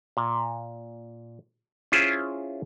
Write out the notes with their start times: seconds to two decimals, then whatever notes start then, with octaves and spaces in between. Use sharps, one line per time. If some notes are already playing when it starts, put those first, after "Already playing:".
0.17 A#2
1.92 C#4 E4 F4 G#4 C5